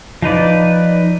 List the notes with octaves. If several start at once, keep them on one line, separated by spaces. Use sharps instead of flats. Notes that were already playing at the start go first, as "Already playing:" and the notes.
F3 D#4 B4 D5